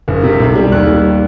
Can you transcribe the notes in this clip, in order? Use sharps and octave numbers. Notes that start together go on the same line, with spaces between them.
F#1
C3
B1
G3
D#2 F#6
G3